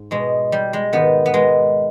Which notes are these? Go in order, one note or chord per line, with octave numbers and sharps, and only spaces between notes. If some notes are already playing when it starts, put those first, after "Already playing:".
Already playing: G#2
B2 G#3
G3
G#3
G#2 D#3 B3
B3
G#3